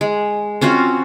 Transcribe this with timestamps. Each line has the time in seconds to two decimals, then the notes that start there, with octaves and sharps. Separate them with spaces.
0.01 G#3
0.61 C4 C#4 F4 F#4